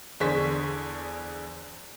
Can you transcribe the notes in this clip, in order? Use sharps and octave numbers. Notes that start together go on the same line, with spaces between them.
E2 D3 G#4 C5 C#6 B6